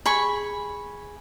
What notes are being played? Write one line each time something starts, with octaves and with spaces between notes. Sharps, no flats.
G#4 B5 C#6